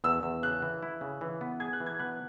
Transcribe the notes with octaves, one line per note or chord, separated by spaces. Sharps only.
E2 E6
E2
C#3 F#6
E3
E4
C#3
E3
B3
G#4 G#6
F#6
E3
G#6
B3 F#6